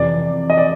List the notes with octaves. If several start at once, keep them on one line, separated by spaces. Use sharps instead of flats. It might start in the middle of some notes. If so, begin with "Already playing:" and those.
Already playing: F2 C3 E3 D5
D#5
D5